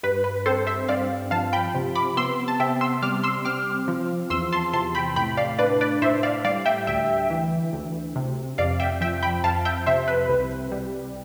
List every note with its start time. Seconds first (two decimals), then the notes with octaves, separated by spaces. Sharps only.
0.03 G2 B4
0.24 B4
0.46 C4 A4 C5
0.67 C5 E5
0.88 G2 D5 F5
1.31 F3 F5 A5
1.53 G5 B5
1.75 C3
1.95 B5 D6
2.17 B3 C6 E6
2.48 A5
2.60 C3 E5 G5
2.81 C6 E6
3.02 G3 D6 F6
3.24 C6 E6
3.45 C4 D6 F6
3.88 F3
4.30 E2 C6 E6
4.53 A5 C6
4.73 C3 A5 C6
4.95 G5 B5
5.16 A2 G5 B5
5.37 D5 F5
5.59 D4 B4 D5
5.81 B4 D5
6.02 A2 C5 E5
6.23 D5 F5
6.45 G3 D5 F5
6.66 E5 G5
6.87 D2 E5 G5
7.30 E3
7.73 D2
8.16 C3
8.58 F2 D5 F5
8.80 E5 G5
9.01 F3 E5 G5
9.23 G5 B5
9.44 F2 F5 A5
9.65 E5 G5
9.86 C3 C5 E5
10.08 B4
10.29 C2
10.72 G3